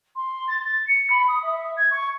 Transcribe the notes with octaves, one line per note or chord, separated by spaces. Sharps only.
C6
A6
A6
C#7
B5
D#6
E5
G#6
C#6